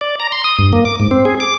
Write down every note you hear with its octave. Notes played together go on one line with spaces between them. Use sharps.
D5
A#5
C6
D#6
G2
A#3
D6
G#2
C4
G#4
D6